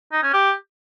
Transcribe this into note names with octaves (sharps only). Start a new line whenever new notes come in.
D#4
C#4
G4